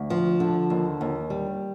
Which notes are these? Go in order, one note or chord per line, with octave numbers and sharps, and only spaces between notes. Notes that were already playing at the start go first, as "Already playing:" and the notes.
Already playing: D2
F3
D3
D#2
D#2
G3